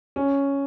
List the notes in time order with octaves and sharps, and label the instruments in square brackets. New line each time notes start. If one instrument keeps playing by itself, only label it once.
[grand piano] C#4